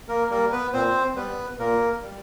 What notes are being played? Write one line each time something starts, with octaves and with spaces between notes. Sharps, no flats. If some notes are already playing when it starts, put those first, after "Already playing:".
A#3 A#4
G3 A#3 A#4
B3 B4
A#2 C4 C5
G3 B3 B4
A#2 A#3 A#4
G3